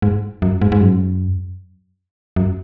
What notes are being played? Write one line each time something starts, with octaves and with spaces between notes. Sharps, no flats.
G#2
F#2
G#2
G#2
F#2
F#2